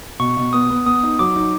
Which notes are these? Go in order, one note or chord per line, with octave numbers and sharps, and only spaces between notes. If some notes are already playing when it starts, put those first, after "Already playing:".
B2 C#6
B2
B3 D#6
B3
B3 D#6
D#4
F#3 D6
D#4